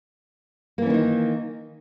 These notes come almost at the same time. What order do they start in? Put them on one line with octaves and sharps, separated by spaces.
A#3 E3 C#4 D#3 D#4